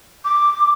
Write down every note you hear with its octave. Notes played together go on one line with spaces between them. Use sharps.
D6